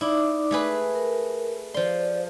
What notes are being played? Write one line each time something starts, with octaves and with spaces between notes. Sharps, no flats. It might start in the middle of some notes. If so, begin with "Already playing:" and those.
D#4 E4 D5 D6
A3 G#4 B4
A#4
F3 D5 C6